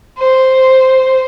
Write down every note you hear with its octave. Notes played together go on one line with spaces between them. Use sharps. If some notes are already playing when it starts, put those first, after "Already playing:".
C5